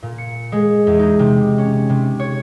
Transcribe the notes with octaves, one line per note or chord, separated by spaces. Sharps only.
A#2
C#7
G#3
E2
D#4
C3
C#4
C3
C#5